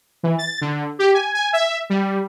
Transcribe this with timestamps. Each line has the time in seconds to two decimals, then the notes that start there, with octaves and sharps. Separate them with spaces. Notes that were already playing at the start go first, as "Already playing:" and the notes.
0.23 E3
0.38 A6
0.61 D3
0.99 G4
1.14 G#5
1.35 G#5
1.53 E5
1.90 G3